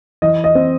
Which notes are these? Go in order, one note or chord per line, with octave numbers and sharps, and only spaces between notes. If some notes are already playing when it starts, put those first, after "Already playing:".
E3 D#5
D#5
C4